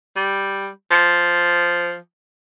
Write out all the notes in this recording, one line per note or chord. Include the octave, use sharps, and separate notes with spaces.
G3
F3